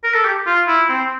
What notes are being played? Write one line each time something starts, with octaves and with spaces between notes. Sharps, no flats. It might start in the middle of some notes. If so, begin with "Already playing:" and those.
A#4
A4
G4
F4
E4
C4